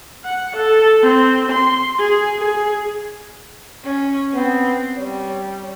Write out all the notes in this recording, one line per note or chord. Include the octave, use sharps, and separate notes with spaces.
F#5
A4
C4
C6
G#4
G#4
C#4
B3 C4
G3 C#5